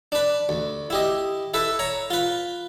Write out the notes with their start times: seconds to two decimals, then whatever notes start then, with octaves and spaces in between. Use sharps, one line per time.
0.12 D4 B4
0.49 D2
0.90 E4 G4 D#5
1.54 E4 A4 B4 E5
1.79 C#5 A#5
2.10 F4 B4